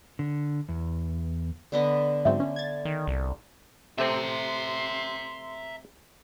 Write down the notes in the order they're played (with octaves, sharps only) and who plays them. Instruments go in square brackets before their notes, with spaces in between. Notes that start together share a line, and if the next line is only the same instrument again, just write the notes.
[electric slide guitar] D3
E2
[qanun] D3 B3 D#5
[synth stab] G#2 F#3 C4 [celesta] E5
[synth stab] C#4
G#6 A6
[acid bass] D#3
C2
[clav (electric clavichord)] C3 A3 C4 [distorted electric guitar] E5 A#5 [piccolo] C6